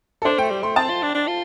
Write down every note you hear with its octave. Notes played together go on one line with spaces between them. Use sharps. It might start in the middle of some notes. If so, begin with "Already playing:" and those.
A4
D4 C5
A3 G5
G3
A3 C6
C4 A5
F4
D4
D4
F4